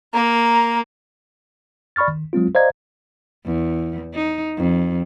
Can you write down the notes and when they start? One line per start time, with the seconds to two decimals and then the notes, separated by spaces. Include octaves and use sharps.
0.14 A#3 A#5
1.96 D5 B5 C#6 F6 A6
2.08 D#3
2.33 F#3 G#3 C4 F4
2.55 C5 D5 D#5 F5 A#5 G#6
3.45 E2
4.15 D#4
4.57 F2